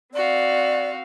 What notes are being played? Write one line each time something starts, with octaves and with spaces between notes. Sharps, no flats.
C4 F#4 D5 F5